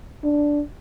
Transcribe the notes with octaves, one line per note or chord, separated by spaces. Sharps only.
D4